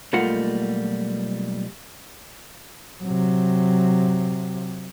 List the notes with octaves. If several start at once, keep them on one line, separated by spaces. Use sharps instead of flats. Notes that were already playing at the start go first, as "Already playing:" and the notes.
B1 G3 A3 A#3 F4 F#5
C3 F#3